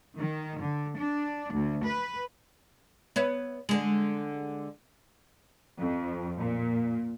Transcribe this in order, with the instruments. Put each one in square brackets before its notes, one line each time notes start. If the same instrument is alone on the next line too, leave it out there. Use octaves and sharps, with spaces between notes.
[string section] D#3
D3
D4
D2
B4
[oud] B3 C#5 E5
D3 G#3
[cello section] F2
A#2